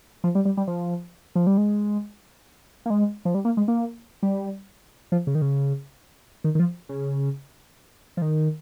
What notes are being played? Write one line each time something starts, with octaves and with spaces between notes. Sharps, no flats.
F3
G3
G3
G3
F3
F3
G3
G#3
A#3
G#3
F3
G3
A#3
G#3
A#3
G3
F3
C#3
D#3
C#3
D#3
D#3
F3
C#3
F3
D#3